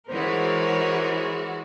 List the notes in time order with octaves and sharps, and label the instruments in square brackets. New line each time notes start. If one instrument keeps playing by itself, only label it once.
[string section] E3 G#3 F#4 [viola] A#4 C#5 [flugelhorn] C5